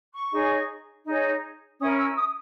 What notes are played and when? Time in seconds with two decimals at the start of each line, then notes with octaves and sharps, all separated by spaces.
0.12 C#6
0.31 D#4 G#4 C#5
1.05 D#4 G#4 C#5
1.79 C#4 E4 A#4 D#6
1.98 E6
2.16 D#6